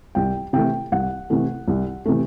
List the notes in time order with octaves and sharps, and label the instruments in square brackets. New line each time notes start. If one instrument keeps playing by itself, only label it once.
[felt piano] C2 G5
C3 E3 A3 G5
C2 F#5
C3 E3 A3
C2
C3 E3 A3